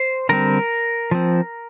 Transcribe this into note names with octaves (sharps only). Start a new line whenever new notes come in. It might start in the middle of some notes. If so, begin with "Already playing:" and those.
Already playing: C5
D3 G3 C4 A#4
F3 C4